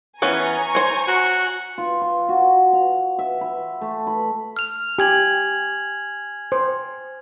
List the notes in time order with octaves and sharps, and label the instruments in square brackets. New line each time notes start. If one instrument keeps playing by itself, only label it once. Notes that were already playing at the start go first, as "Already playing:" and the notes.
[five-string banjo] E3 B3 C#4 [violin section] G#5 A#5 C#6
[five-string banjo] C5 C#5
[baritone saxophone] F#4
[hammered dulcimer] F4
C6
F#4
F5
E5
B5
A3
B5
[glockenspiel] F6 F7
[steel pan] G4 [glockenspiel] G#5 G#6 F#7
[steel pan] C5